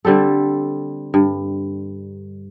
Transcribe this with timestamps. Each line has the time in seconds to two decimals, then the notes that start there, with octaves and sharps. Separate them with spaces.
0.05 D3 G3 C4 A4
1.14 G2